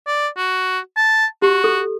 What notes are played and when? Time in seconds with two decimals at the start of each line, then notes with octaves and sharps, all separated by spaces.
0.07 D5
0.37 F#4
0.97 A5
1.42 F#4 G4
1.64 A4